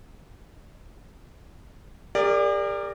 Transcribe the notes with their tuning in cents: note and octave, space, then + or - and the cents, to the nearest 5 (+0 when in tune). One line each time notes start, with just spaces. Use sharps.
G4 +45 A#4 -15 D5 +0